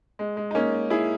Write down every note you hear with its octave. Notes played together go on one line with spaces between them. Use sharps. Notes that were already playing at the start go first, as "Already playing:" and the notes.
G#3
G#3
D#4
A#3 C#4
E4 G#4